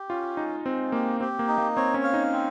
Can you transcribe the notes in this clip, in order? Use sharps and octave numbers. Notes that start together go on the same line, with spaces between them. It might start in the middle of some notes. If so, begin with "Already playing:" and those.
Already playing: G4
C#4 F4
G#3 D#4
G#3 C4
A#3 G4
C4 G4
A#3
D#4
A#3
C4 C#5
C#4
F5
D#4
C4